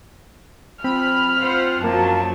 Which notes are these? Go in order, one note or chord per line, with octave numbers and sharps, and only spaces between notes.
F3 C4 B5 F6
F4 C5 F#5
F#2 F3 F#3 A#3 A5